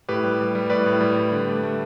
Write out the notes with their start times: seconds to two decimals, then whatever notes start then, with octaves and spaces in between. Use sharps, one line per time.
0.09 A2 G4 B4
0.24 G3
0.40 G3
0.55 G3
0.70 A2 B4 D5
0.86 A2
1.01 G3
1.16 G3
1.32 D3
1.47 A3
1.63 A3